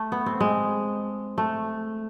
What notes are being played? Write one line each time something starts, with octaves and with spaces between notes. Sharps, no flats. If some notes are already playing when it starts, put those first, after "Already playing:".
Already playing: A3
B3
C4
G#3
A3